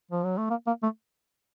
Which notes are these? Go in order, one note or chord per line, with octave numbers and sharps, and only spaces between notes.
F3
F#3
A3
A#3
A#3
A3